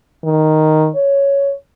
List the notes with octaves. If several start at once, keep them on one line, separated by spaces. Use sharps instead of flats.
D#3
C#5